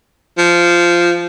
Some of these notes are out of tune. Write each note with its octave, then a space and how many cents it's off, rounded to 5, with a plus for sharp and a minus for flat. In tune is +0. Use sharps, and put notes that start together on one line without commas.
F3 -10